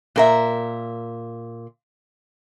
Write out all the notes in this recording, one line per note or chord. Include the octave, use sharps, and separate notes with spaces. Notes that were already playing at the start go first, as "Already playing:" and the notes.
A#2 A#4 E5